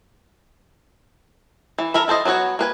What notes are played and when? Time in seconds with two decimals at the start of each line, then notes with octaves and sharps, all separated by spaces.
1.78 E3
1.94 A4 A#4 E5 B5
2.08 E4 A4 C5 D#5
2.25 F#3 B3 C#4 F#4 C#5
2.59 A#3 B4 G#5